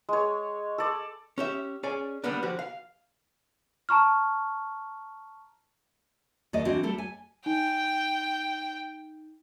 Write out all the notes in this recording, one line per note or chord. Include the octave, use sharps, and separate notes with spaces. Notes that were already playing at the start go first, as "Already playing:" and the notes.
G#3 C#5
A4 D5
C#4 G4 E5
C#4 G#4 D5 G#5
D3 G3 A#3 B3 D4
D3 F3 F#4 G4
F5
A5 A#5 C#6 F6
D#2 A3 D5 D#5
D3 E3 C4 F#4
G3 A3 A4
G#5
D#4 G5